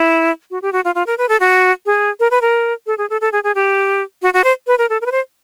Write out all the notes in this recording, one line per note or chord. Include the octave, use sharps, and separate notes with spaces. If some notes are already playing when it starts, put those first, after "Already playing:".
Already playing: E4
F#4
G4
F#4
F4
F4
A#4
B4
A4
F#4
G#4
A#4
B4
A#4
A4
G#4
A4
A4
G#4
G#4
G4
F#4
F#4
C5
B4
A#4
A4
A#4
B4
C5